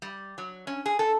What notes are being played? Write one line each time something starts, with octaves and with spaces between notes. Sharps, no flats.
G3
F#3
C#4
G#4
A4